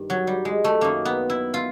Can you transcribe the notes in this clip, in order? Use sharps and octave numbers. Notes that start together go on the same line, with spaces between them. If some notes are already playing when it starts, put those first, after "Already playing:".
Already playing: G2 D#3
F#3
G3
G#3
A3
F#2 D#3 A#3
B3
E4
F4